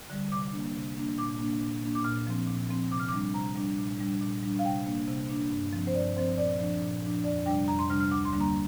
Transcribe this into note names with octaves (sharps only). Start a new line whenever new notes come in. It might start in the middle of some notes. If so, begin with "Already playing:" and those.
D3 G3
C3 D6
A#3 D4
C3
A#3 D4
A#2 D6
A#3 D4
A#2
A#3 D4
D6
A#2 F6
F3 C4
A#2
F3 C4
C3 D6
F6
D6
G3 D4
C3 A#5
G3 D4
A#2
G3 D4
A#2
G3 D4
F5
C3 G5
A#3 D4
C3
A#3 D4
G2
F3 C4
C5
G2 D5
F3 C4 C5
A#2 D5
F3 D4
A#2
F3 D4
F2 D5
C3 G3 D4 G5
F2 A#5
C6
C3 G3 D4 F6
F6
D2 D6
C6
D3 G3 A#3 D4
A#5